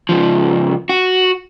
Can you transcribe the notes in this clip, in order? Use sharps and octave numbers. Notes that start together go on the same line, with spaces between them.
C#2 F3
F#4